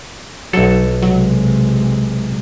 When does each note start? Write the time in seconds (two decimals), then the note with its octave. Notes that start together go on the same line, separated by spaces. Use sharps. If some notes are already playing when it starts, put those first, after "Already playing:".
0.53 B1 F#3 A4
1.02 C3 F#3 G#3